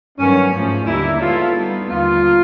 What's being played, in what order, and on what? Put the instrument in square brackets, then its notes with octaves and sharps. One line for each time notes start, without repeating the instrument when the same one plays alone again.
[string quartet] G2 D#3 F#3 B3 [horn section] C#4
[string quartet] G#2 F3 A3 C#4
[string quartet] D#2 D3 G3 A#3 D#4 [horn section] E4
[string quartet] G#3 B3 E4 A4 C#5 [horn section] F4
[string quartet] G3 B3 D#4
[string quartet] D#2 D3 G3 B3 D#4 [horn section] F4